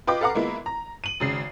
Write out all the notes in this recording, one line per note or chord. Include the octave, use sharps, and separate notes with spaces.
F4 B4 D#5 G5 D6
A4 B4 F5 F#5 A#5 D6
G#3 A#3 B3 E4 F4
A#5
D#7 F#7
G#1 C#3 C7